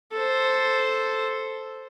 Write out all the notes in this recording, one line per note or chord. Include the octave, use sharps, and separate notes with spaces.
A4 C5